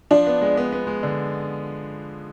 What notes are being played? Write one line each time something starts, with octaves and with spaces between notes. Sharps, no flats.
F3 D4
B3
G#3
B3
B3
G#3
D3